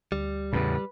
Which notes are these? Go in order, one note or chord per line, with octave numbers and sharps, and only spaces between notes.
D2 G3
E2 A2 C#3 B4